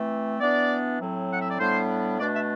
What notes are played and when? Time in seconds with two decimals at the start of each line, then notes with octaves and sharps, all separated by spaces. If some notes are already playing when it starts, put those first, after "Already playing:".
Already playing: E3 A3 C4
0.40 E3 B3 D4 D5
1.00 A2 F#3 C4
1.33 F#5
1.41 E5
1.50 D5
1.59 A2 G3 B3 D4 C5
2.19 B2 A3 D4 D5
2.34 E5